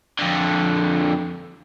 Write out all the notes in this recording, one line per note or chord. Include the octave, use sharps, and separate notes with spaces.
F2 D3